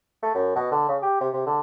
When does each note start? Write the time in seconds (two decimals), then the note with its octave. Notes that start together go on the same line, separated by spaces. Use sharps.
0.23 A3
0.35 F#2
0.56 B2
0.71 D3
0.89 C#3
1.02 G4
1.21 C3
1.33 C3
1.46 D3